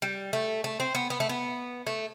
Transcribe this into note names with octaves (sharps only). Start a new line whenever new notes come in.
G3
A3
A3
C4
B3
B3
A3
B3
A3